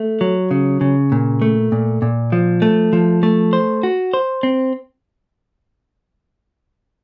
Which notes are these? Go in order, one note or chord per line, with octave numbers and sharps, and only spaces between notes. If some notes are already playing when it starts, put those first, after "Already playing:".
Already playing: A3
F#3
C#3
C#3
A#2
A3
A#2
A#2
F3
A3
F3
A3
C5
F#4
C5
C4